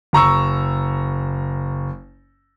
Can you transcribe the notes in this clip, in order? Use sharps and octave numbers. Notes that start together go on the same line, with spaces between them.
F#1 A#5 C#6 E6